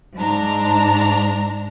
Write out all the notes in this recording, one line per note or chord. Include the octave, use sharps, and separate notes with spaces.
G#2 D4 A#5